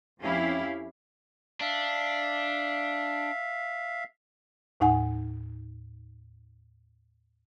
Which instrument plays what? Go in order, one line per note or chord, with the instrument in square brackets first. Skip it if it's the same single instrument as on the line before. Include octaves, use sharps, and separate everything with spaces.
[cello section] F2 C#4 E4 G4 F5
[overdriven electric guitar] D4 [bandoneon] E5 F5
[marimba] D#2 A2 D#4 F#5 G#5